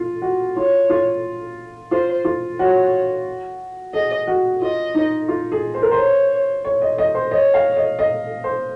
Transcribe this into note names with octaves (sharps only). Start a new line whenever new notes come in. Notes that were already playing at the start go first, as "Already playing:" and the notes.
Already playing: F4
F#4
F4 C#5
F4
F4 C5
F4
F#4 C#5
G#4 D#5
F#4
F4 D#5
D#4
F4
G#4
C5
A#4
C5
C#5
C#5
D#5
D#5
C5
C#5 D#5
F5
D#5
D#5
C5